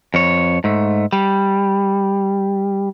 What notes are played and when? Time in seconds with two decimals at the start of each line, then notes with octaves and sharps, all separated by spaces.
0.14 F2 C#5
0.64 G#2 A3
1.13 G3